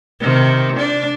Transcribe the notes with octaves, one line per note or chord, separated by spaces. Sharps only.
C3 D#3
D4 D5